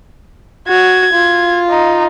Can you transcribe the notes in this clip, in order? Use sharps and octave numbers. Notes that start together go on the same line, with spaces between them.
F#4 G#6
F4
D#4